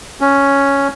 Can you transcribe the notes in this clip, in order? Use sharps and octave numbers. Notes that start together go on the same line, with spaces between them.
C#4